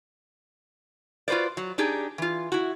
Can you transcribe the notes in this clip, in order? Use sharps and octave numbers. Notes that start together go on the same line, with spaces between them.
F4 F#4 B4 C5 D5
F#3
D4 D#4 G4 G#4
E3 F4
E4 F#4